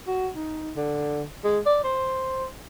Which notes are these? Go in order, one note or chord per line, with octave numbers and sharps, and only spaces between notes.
F#4
D#4
D3
G#3
D5
C5